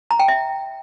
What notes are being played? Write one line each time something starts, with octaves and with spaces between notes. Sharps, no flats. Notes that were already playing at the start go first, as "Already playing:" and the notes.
A#5
G5
E5